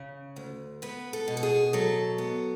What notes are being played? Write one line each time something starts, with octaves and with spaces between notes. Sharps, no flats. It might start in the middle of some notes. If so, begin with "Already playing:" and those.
Already playing: C#3
D2
B3 B4
A4
B2
A4
G#4
F#3 A4
B3